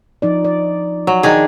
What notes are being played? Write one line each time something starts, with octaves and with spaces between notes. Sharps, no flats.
F3 D#4 D5
D5
F#3
D#3 D4 G#4